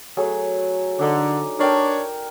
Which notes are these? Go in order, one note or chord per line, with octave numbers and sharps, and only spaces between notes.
F#3 A3 G#4
D3 D4 D#4 D#5
D4 A#4 C#5 D#5 G5